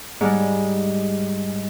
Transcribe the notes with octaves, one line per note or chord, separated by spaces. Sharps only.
G#2 G3 G#3